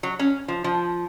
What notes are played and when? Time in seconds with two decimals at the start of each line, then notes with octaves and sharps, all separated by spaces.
0.03 F#3
0.19 C#4
0.48 F3
0.64 F3